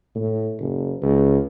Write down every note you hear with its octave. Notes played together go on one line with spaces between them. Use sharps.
A2
F#1
C#2